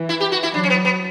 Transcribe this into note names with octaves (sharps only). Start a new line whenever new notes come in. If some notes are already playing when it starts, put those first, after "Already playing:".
Already playing: E3
E4
G4
F#4
E4
F#3 D4
C#4
B3
B3